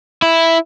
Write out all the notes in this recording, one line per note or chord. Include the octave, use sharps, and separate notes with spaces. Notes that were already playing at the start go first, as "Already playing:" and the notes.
E4